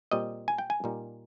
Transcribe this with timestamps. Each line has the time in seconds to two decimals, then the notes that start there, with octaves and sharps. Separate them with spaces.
0.11 A#2 G3 C4 D#5
0.48 G#5
0.58 G5
0.70 G#5
0.84 A#2 G3 A#3 D#4